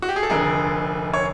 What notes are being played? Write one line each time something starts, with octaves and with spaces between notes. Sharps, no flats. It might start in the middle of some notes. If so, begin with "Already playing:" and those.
F#4
G4
G#4
A4
F1 F2 D3 G#4 A#4
C#5